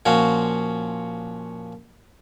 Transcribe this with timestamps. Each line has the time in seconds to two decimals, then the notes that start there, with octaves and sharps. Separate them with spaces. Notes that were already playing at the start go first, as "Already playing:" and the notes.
0.06 A#2 F3 C#4 F#4